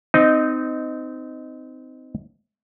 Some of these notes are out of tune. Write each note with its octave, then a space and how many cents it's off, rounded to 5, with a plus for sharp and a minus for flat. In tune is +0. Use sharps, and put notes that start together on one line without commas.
C4 -25 D#4 +0 D#5 -5